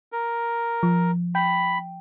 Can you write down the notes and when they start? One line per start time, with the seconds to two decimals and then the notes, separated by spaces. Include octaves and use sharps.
0.12 A#4
0.83 F3
1.35 G5 B5